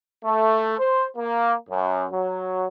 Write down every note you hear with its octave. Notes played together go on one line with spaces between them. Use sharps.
A3
C5
A#3
F#2
F#3